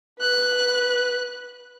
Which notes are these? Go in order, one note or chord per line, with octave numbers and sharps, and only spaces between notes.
B4 F#6